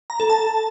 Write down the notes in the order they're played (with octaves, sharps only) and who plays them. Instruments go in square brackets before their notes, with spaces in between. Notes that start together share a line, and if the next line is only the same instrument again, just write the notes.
[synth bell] A#5
A4
A5